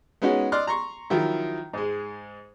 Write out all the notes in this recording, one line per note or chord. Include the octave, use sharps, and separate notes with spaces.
G#3 B3 C#4 D#4 F#4 C#5
D5 D#5 C6 F6 F#6
A#5 C6 C#6
D#3 F3 F#3 E4
G#2 G#3